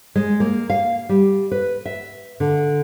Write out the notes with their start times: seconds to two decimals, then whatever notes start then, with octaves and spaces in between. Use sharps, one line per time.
0.16 G#3
0.40 A#3
0.70 F5
1.09 G3
1.51 B4
1.86 E5
2.40 D3